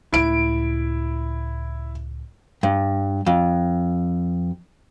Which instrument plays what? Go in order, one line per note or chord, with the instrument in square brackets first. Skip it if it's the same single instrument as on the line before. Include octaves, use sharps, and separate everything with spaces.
[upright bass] C#2 A2 [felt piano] E4 D7
[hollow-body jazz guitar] G2
F2